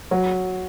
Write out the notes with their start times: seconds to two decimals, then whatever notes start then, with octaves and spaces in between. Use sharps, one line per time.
0.11 F#3